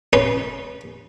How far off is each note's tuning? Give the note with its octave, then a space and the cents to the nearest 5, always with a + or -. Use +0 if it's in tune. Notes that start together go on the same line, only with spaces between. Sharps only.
C#4 +0 B4 -20 C6 +0